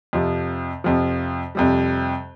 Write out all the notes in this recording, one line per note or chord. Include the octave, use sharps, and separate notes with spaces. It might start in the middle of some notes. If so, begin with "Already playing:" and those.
F2 C3 F3
F2 C3 F3
F2 C3 G3